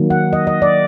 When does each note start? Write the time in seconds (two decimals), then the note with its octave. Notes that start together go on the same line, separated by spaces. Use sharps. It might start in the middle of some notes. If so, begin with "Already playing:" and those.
Already playing: D#3 F#3 A#3
0.10 F#5
0.33 D#5
0.47 D#5
0.62 D5